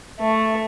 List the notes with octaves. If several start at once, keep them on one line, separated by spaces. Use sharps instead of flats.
A3